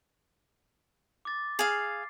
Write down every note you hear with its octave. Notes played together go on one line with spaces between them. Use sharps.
D6 A6
G#4 F5 C7